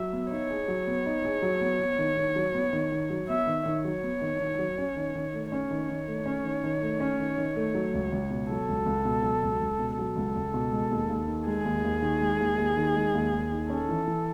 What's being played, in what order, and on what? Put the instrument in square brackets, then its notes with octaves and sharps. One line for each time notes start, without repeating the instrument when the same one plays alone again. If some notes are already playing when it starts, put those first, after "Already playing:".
Already playing: [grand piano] F#3 [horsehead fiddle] E5
[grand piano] B3
[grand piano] D#4 [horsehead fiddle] C#5
[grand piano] G#4
F#3
B3
D#4
G#4
F#3
B3
B3
D#3
D#3
F#3
B3
D#3
D#3
F#3
[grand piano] B3 [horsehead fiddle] E5
[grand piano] D#3
[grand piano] D#3 [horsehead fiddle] C#5
[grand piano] F#3
B3
D#3
D#3
F#3
C#4
D#3
D#3
A3
[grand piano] C#4 [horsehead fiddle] C#5
[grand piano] D#3
D#3
A3
C#4
D#3
D#3
A3
C#4
D#3
D#3
A3
F#3
C#2
C#2
B2
[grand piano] F#3 [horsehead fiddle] A4
[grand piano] C#2
C#2
B2
F#3
C#2
C#2
B2
[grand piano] F#3 [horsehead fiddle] A4
[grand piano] C#2
C#2
B2
G#3
D#2
D#2
D#3
[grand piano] G#3 [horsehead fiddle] G#4
[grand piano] D#2
D#2
D#3
G#3
D#2
D#2
D#3
G#3
D#2
D#2
D#3
[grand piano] C#4 [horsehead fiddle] A4
[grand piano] E3
E3